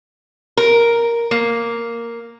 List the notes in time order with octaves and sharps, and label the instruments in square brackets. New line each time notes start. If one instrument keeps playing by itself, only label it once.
[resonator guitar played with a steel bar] A#4
A#3